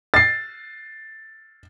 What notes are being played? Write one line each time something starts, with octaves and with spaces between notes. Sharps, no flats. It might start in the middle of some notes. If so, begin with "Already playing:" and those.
A6 C7